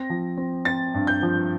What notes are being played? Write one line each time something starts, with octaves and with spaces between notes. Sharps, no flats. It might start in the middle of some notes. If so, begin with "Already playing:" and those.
Already playing: C4 A#6
F3
C4
C4 A6
G2
G6
F3